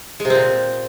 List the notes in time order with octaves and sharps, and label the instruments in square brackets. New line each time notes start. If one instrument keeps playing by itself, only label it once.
[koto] G#3
C3
C4
A#2